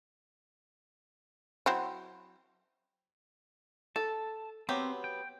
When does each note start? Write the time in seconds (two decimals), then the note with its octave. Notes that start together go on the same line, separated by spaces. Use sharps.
1.66 F#3 C4 E4
3.96 A4 A5
4.69 F#3 B3 C4 G4
5.04 G5